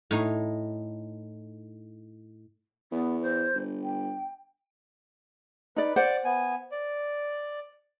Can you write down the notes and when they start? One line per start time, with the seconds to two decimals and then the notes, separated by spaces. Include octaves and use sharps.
0.11 A2 D#4
2.92 E2 B3
3.21 C5
3.55 G1
3.83 G5
5.76 D#4 B4 D5
5.96 C5 D5 F#5 D6
6.24 B3 G#5
6.72 D5